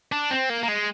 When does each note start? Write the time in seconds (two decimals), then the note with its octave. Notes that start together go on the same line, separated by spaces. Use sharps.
0.12 D4
0.31 C4
0.50 A#3
0.63 A#3
0.68 G#3